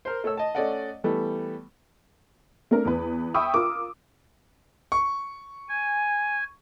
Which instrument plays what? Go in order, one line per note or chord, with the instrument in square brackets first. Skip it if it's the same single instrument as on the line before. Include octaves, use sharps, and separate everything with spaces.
[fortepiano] A#4 C5
A3 C#5 E6
D#5 A5
A3 C#4 A4 D5 D#5 F#5
E3 G3 A3 B3
[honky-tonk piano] A3 C4 D4 A#4
E2 B4
E5 G5 B5 C#6 D#6 E6
F4 A#4 D6
[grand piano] C#6
[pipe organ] G#5